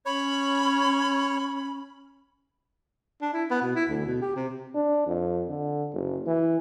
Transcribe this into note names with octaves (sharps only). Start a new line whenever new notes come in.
C#4 C#5 B5
D4
E4
B3
B2
E4
D2
B2
G4
C3
D4
F2
D3
F#1
E3